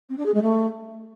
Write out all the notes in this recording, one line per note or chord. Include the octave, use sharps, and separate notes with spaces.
C4
D4
G#4
G#3
A3